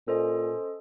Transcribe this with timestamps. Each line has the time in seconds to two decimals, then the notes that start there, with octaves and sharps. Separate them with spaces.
0.07 A#2 C#4 A4 C5 D#5